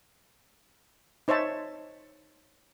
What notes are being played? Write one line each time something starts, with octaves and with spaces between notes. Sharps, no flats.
D#4 C5 C#5 E5 A5